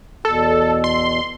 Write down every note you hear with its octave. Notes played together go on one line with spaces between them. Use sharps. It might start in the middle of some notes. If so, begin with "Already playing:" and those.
E2 B2 A4
C6